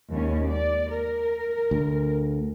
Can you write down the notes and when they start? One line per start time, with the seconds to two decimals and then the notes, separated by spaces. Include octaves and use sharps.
0.12 D#2 G#2 C#4
0.49 D5
0.93 A#4
1.71 D2